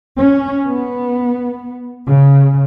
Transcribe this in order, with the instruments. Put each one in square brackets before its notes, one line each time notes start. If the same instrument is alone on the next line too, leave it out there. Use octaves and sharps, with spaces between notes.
[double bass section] C#4
B3
C#3